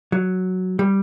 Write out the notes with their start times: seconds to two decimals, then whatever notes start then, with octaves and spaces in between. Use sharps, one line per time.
0.12 F#3
0.79 G3